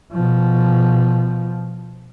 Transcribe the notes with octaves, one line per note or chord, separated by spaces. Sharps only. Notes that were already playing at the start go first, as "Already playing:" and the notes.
B2 F3